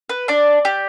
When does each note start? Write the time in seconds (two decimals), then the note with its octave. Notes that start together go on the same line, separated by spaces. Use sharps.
0.09 B4
0.28 D4 D5
0.65 G4